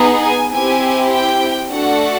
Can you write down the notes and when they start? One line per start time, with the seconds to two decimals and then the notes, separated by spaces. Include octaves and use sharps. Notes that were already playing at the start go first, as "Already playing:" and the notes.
Already playing: B3 D#4 G#4
0.22 G#5
0.52 C4 E4 G4 G#5
1.11 G5
1.71 A3 D4 F#4 A4 F#5